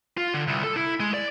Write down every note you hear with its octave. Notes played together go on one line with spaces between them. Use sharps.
F4
D3
C2
A4
E4
G#3
D5